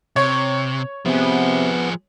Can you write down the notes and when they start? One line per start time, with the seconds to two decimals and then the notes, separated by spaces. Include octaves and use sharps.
0.16 C3 C#5
1.05 C3 F3 B3 G#4